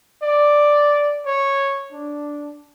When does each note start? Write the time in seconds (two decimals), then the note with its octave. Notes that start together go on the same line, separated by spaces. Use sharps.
0.23 D5
1.26 C#5
1.92 D4